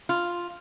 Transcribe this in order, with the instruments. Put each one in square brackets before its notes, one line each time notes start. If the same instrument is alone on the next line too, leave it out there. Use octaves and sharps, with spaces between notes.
[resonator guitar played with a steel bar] F4